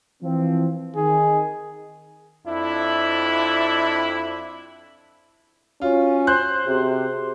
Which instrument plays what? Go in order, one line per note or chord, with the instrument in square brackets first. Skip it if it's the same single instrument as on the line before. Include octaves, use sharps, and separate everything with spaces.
[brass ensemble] E3 F3 C4
[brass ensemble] D#3 [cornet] G#4
[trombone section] F2 D4 E4
[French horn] C#4 [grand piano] F4 [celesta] F#4 C#5
[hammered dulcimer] C5 [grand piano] F#6
[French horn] C3 [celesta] F#4 G#4